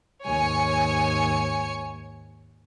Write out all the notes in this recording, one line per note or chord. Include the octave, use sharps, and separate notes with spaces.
D#2 G#2 C#5 G#5 C#7